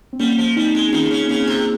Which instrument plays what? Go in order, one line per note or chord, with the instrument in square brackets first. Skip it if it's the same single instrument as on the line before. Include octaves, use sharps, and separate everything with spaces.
[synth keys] C4
[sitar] G3 [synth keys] A#3 C#4
[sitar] F3
[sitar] G3 [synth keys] C4 D#4
[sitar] G#3
[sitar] D#3 [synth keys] C#4 F4
[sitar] C#3
[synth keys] C4
[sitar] C#3 [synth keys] A#3 C#4
[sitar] C3